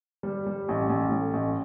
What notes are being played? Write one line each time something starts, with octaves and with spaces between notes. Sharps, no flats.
G3
G3
A1
A1
A2
A1